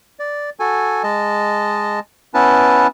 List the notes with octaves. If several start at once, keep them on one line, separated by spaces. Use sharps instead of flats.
D5
F#4 A4 G#5
G#3 D#5 A5
B3 C#4 E4 B4 A5